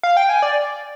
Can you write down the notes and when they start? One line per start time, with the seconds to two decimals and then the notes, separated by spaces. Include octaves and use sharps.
0.03 F5
0.17 G5
0.29 G#5
0.42 D5